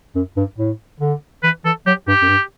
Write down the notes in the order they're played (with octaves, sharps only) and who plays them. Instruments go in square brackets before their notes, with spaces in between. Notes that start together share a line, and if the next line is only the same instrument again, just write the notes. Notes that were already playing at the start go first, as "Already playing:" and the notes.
[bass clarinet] F#2
G2
A2
D3
[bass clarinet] E3 [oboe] B4
[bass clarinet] E3 [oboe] A4
[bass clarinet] F#3 [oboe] G4
[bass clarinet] G2 [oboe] G4
[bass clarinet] F#2
G2